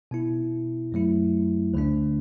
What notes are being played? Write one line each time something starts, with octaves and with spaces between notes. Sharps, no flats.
B2 B3 E4
F#2 F#3 A3 E4
D2 D3 A3 D4